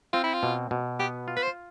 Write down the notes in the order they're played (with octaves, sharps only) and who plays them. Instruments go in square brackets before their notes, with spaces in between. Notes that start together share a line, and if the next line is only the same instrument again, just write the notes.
[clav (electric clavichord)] C4 [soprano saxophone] F4
[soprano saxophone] E4
F4
[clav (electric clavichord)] B2
B2
[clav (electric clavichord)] B3 [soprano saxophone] G4
[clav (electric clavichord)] F4
[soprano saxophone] B4
C5